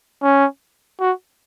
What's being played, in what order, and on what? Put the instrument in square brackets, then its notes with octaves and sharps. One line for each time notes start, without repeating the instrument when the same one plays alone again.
[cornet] C#4
F#4